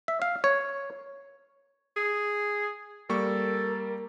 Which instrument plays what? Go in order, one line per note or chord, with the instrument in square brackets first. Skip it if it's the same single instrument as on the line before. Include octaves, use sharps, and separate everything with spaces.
[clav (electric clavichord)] E5
F5
C#5
[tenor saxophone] G#4
[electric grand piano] G3 A#3 C#6 [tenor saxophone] A4 [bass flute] A#4